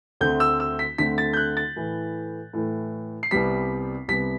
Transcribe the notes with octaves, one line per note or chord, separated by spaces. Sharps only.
D2 D3 A3 C4 G6
E6
E6
B6
D2 D3 A3 C4 B6
A6
G6
F#6
A6
A2 E3 A3
A2 E3 A3
C7
C2 C3 G3 B3 B6
C2 C3 G3 B3 B6